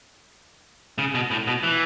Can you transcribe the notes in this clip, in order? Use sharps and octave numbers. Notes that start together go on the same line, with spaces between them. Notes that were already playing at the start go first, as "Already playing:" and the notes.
C#3
B2
A2
B2
E3